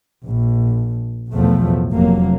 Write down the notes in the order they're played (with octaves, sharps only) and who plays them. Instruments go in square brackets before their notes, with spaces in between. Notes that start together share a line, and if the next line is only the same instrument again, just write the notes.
[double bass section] A#1
B1 E2 A2 F3 A3
F1 F#3 A#3